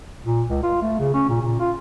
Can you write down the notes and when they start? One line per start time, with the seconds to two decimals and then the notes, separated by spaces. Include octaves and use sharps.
0.25 A#2
0.48 C#2
0.63 F4
0.82 A3
1.00 C#3
1.14 C#4
1.29 A#2
1.42 A#2
1.60 F4